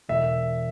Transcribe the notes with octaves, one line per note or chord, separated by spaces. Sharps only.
E1 E5